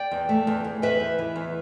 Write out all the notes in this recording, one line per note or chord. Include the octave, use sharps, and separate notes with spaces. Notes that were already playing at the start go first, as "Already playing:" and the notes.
Already playing: D5 G5
E2
A3
E2
E2
E2 B4 E5
E2
E3
E2